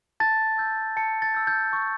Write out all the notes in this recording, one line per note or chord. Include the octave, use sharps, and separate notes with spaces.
A5 A6
E6 G6
A5 C#7
A6
E6 G6
G6
C#6